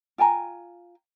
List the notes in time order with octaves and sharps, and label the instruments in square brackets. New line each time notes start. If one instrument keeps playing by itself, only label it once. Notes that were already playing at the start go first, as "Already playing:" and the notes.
[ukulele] F4 G5 G#5 A#5